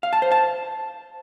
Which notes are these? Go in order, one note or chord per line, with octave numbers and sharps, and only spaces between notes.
F5
A5
C5
A5